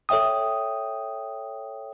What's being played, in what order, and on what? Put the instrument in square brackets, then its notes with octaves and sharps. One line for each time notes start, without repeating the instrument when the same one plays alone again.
[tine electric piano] A4 C#5 E5 G5 D#6